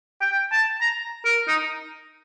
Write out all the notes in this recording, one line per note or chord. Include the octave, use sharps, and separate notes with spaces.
G5
A5
A#5
A#4
D#4